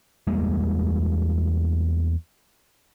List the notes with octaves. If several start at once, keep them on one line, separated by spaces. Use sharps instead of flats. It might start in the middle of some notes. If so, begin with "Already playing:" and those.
E2 G3 G#3 A#3